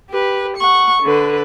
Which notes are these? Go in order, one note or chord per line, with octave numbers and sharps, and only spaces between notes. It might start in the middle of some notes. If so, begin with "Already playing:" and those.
G4 B4
F#5 C#6
D3 B4